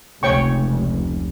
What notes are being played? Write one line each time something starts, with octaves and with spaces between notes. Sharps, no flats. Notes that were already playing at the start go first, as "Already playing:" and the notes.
F1 C#2 C#5 G5 C#6